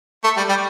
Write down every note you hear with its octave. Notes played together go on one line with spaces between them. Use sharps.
A3 A4
G3 G4
G3 G4